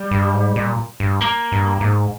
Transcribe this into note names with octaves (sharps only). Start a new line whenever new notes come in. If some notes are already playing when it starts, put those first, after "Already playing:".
Already playing: G3
G2
G#2
A#2
G2
A#3
G2
G#2